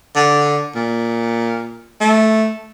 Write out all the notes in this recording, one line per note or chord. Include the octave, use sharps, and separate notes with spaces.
D3
A#2
A3